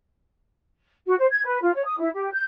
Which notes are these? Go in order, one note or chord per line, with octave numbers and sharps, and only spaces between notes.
F#4
C5
G#6
B4
F4
C#5
D#6
E4
G4
G6